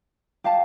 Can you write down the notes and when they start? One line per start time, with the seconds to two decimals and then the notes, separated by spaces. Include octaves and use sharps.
0.44 G4 F5 A5